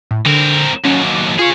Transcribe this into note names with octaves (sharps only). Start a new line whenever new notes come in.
A2
D3 C4 A#4
D#2 F#3 C#4
D6
F4 G#4 C#5